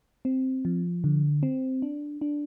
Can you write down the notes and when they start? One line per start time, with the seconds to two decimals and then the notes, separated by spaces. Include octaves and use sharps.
0.25 C4
0.65 F3
1.04 D3
1.43 C4
1.82 D4
2.21 D4